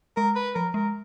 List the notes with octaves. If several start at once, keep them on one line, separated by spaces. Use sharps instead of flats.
G#3 A#4
B4
F3 A#4
G#3 A#4